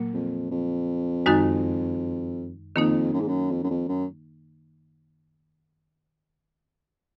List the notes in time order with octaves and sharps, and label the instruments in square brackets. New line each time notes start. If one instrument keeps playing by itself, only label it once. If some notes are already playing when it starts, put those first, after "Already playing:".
Already playing: [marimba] A#2 F#3 A#3
[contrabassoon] F2
F2
[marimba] F#2 D#3 G#3 D#4 F#4
[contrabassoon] F2 [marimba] D#3 A#3 D#4
[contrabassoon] F#2
G#2
F#2
F2
F#2
F2
F#2